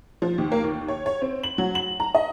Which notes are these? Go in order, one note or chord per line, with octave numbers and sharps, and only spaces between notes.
F3
D#2
A#3
D#2
C#5
C#5
C4
F#7
F#3
F#7
A#5
D#5